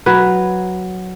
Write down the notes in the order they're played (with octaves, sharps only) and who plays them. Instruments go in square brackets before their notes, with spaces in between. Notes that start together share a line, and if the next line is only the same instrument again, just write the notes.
[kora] F#3 B4